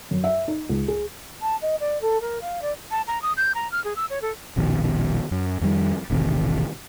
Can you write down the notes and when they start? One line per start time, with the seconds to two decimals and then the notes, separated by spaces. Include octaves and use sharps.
0.11 F#2
0.24 E5
0.48 D#4
0.69 C#2
0.88 G#4
1.41 A5
1.61 D#5
1.80 D5
2.01 A4
2.20 A#4
2.41 F5
2.61 D5
2.91 A5
3.07 A#5
3.22 D#6
3.37 G6
3.55 A#5
3.72 F6
3.84 G#4
3.96 E6
4.10 C#5
4.22 A4
4.56 D#1 A#1 B2 D#3
5.31 F#2
5.61 F2 D#3 G3
6.10 E1 A1 C3 D#3